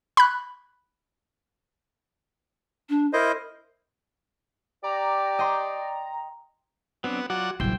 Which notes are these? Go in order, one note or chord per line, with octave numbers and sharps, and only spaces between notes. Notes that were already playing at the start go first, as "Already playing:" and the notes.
B5 F#6
D4
E4 A#4 C5 D#5
G4 D5 A#5
D#5 G5 C6
F#3 B3 C4 D4 F#5
F#3 F4 F#4 D5 F#5
A#1 E3 F#3 C5 G5